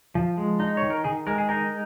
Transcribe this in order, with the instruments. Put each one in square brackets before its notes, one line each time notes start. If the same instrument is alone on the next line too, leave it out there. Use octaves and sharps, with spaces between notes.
[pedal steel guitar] F3
G#3
D#4
C#5
D#3
A#4
D#3 G#4
G#3 A#4
G#4
D#4 A#4